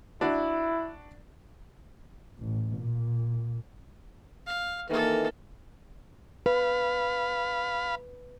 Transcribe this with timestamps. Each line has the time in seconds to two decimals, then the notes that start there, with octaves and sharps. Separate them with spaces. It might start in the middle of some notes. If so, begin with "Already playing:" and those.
0.21 D4 E4 F#4
2.39 A1
2.76 A#2
4.46 F5
4.89 F2 D#3 E3 A#3 A4
6.46 B4 F5 B5